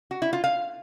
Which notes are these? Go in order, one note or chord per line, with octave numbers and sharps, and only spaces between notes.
F#4
E4
F4
F5